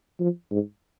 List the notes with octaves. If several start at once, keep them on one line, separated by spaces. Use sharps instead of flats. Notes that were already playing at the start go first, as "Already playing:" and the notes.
F3
G#2